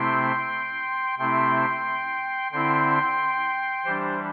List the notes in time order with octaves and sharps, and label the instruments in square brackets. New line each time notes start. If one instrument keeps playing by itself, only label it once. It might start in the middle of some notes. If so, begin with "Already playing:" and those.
Already playing: [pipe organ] C3 A3 C4 E4 G5 C6
C3 A3 C4 E4 G5 C6
D3 C4 E4 G5 C6
E3 G3 D4 G4 C5